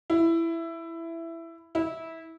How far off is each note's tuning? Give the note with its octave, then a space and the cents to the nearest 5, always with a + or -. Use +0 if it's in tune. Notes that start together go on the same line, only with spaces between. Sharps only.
E4 +10
E4 -20